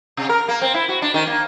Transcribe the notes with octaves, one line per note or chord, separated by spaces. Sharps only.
C3
A#4
A#3
C4
E4
F#4
D4
D#3
A#3